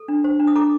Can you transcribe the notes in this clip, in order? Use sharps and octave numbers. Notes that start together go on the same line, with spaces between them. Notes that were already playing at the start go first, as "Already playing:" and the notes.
Already playing: A4
D4
C5
D4
D#6
A4 A#5 D6